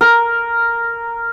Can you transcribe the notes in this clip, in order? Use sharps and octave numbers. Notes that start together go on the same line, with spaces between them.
A#4